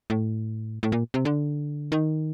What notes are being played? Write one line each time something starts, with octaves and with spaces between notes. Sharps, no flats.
A2
A2
A#2
C3
D3
D#3